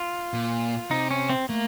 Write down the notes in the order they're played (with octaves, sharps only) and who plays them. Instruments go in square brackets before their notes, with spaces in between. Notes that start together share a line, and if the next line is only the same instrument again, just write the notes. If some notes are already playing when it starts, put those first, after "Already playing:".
Already playing: [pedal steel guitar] F4
[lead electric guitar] A#2
[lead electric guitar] C3 [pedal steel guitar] D#4
[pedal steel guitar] C#4
C4
[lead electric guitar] A3 [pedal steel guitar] A#3